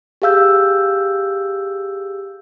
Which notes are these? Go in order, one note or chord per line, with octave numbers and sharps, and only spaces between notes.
G4 G#4 F5 E6 G6